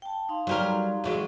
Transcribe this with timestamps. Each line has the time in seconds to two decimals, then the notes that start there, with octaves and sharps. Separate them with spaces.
0.02 G5 A5
0.29 D#4 F5 C6
0.47 F#3 G3 A#4
1.04 E2 F#3 G#3